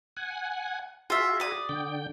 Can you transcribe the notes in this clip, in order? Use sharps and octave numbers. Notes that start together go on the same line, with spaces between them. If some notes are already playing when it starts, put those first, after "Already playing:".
F#5 G#5
F4 F#4 G#4 E5
D5 D#6
D3 G5